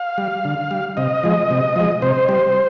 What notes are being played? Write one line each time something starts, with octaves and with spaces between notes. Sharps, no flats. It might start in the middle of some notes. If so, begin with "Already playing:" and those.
Already playing: F5
G3
D3
G3
C3 D#5
F3 G#3
C3
F3 G#3
C3 C5
G3